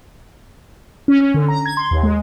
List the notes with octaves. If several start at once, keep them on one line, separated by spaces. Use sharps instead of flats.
C#4
C#4
D3
A#5
G#6
C6
D#2
G#3